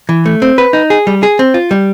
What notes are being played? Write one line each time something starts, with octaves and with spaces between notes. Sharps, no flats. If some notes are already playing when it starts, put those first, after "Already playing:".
E3
A3
C4
B4
D#4
G#4
G3
G#4
C4
F4
G3